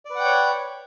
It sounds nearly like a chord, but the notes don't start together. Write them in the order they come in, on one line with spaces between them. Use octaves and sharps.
D5 B4 F#5 G5 C#5